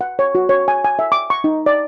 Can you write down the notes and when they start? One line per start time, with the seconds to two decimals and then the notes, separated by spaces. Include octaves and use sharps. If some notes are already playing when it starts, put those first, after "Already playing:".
0.01 F#5
0.19 C#5
0.35 F#4
0.49 C#5
0.68 G#5
0.84 G#5
0.99 E5
1.12 D6
1.30 C#6
1.44 D#4
1.66 D5